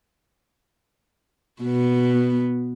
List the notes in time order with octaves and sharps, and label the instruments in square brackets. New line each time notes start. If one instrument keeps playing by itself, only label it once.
[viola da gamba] B2 B3